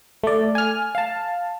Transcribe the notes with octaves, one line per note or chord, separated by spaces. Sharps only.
A3 D5
G#5 F6
F5 A5